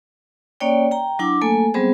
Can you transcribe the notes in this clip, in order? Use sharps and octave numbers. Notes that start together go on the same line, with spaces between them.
A#3 C#4 C#5 D5 G5
G5 A#5
F#3 D4 E4 F#5 D6
A3 A#3 A4 G#5
F#3 G3 B3 C4 G#4 C5